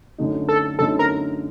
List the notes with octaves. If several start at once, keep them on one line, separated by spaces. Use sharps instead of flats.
F#2 D3 A3 D#4
A4
F#2 D3 A3 D#4 A4
A#4